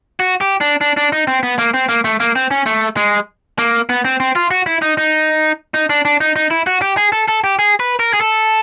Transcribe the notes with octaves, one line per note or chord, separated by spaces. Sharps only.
F#4
G4
D4
D4
D4
D#4
C4
B3
A#3
C4
A#3
A3
A#3
C4
C#4
A3
G#3
A#3
B3
C4
C4
F4
F#4
E4
D#4
D#4
D#4
D4
D4
D#4
D#4
E4
F#4
G4
G#4
A4
A4
G4
G#4
B4
A#4
G#4
A4